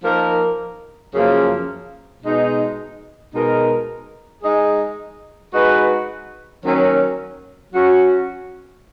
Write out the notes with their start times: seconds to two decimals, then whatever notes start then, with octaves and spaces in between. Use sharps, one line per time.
0.03 F3 A#3 D#4 A#4
1.14 F#2 C#3 F3 A#3
2.23 B2 G#3 D#4
3.33 B2 G#3 D#4 A#4
4.43 G#3 D#4 G#4
5.53 G#3 D#4 F#4 B4
6.63 D#3 F#3 A#3 C#4
7.73 F#3 C#4 F#4